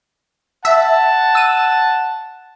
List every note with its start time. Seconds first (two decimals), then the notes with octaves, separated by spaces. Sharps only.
0.65 E5 F#5 A5
1.35 E6 D#7